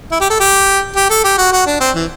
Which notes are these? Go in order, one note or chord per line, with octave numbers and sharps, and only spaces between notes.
E4
G4
A4
G4
G4
A4
G4
F#4
F#4
D4
C4
E3